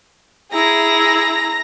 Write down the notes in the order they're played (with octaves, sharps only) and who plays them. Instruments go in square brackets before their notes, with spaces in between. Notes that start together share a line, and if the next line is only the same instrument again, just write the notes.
[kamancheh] E4 G#4 [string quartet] A#5 A#6